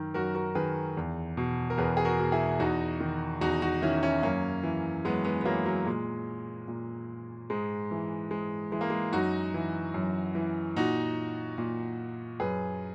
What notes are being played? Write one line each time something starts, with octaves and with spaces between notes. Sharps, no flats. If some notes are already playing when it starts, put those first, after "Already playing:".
Already playing: F#2 D#3
F#2 F#4 A#4
F#4 A#4
D#3 G#4 B4
E2
B2
A#4
E2 G#4 B4
G#4
F#4 A#4
B2
E4 G#4
E2 D#4 F#4
D#3
E2 D#4 F#4
D#4 F#4
D#3 C#4 E4
C#4 E4
F#2 A#3 C#4
E3
F#2 G#3 B3
G#3 B3
B3
E3 F#3 A#3
F#3
A#2 G#3
A#2
G#2 G#3
E3
G#2 G#3
E3 G#3
A#3
G#3
F#2 D#4 F#4
E3
F#2
E3
A#2 D#4 F#4
A#2
F#2 G#4 B4